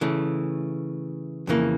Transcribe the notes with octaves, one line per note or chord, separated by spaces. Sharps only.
C#3 E3 A3
F2 C#3 E3 A#3